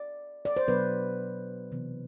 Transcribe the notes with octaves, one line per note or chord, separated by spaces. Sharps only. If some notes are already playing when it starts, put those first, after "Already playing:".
Already playing: D5
D5
C5
B2 F#3 B3 D4 B4
C3 E3 B3